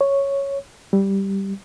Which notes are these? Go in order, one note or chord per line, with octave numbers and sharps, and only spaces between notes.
C#5
G3